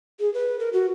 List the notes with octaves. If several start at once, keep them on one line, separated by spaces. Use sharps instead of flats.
G#4
B4
A#4
F#4